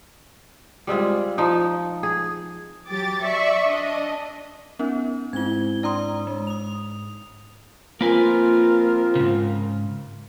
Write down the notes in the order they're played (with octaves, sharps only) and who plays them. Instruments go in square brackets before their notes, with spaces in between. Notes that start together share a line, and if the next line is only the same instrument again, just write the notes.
[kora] G3 G#3 C4 F4
F3 D#4
G#4
[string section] F#3 G4 D6 A6
D5 E5 C#6
D4 D#5
[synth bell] B3 C#4 D#4 [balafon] A#4
[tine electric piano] G#2 [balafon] C4 E4 [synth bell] G#6 G7
[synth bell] D4 A#5 D#6 [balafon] D5 C6
[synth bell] G#3
D#6 F7
[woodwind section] F3 C4 F4 [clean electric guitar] A#3 B4 G#5 [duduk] A#4
[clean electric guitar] G#2 C#3